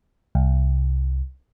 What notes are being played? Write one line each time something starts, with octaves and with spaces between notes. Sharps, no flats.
C2